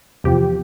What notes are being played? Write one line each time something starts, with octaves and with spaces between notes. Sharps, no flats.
E2 C3 F3 G4